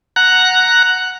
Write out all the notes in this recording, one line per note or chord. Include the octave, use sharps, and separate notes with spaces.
F#5 A#5 F#6